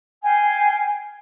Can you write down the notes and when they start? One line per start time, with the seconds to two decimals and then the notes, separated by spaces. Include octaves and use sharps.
0.22 F5 G5 G#5